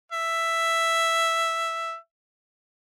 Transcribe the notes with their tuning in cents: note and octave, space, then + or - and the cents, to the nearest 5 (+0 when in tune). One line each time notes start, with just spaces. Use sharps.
E5 +5